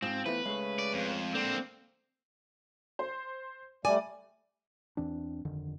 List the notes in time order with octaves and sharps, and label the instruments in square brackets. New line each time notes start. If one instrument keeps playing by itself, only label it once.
[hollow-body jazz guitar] G#2 [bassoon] F3 [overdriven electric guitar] C4
[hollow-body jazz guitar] E3 A3 B3 [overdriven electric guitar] B4
[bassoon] C#3 [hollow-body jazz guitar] G#3 A3
[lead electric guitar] D5
F2
[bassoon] D3 [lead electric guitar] A#3 C5 [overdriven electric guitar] C4
[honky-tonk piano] C5
[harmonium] G3 A3 [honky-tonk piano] D5 [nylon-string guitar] G#5
[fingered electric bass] E2 E3 C4 D4
G1 F2 D3 D#3